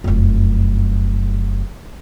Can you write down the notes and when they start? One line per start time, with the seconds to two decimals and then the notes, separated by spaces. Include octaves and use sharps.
0.04 F1 F#2